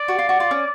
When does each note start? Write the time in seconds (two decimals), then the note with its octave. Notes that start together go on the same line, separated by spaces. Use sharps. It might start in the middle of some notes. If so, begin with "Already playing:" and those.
Already playing: D5
0.08 F#4
0.19 F4
0.29 F#4
0.40 F4
0.51 C#4